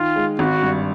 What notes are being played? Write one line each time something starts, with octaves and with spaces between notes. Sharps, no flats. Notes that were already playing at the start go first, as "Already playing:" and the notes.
Already playing: D#3 F4
G#3
G#1 F#4
G2